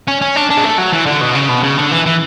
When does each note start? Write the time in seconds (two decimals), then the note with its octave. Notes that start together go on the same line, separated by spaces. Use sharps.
0.08 C#4
0.22 C#4
0.36 D4
0.50 D4
0.58 G#3
0.64 A3
0.78 F#3
0.92 E3
1.06 D3
1.21 B2
1.35 C#3
1.49 B2
1.63 C#3
1.77 D3
1.91 E3
2.06 E3